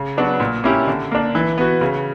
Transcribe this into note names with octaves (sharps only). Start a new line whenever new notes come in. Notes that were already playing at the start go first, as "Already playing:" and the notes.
Already playing: C#3
F#3 B3 D4 F#4
A#2
A#3 C#4 E4 G4
D3
A#3 D4
E3
B3 F#4
C#3